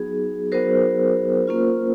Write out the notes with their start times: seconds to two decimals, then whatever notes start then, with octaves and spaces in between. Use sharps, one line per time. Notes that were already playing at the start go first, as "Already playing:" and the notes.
Already playing: F#3 B3 D#4 F#4 G#4
0.52 F#3 B3 D#4 F#4 A#4 C5
1.47 A#3 C#4 F4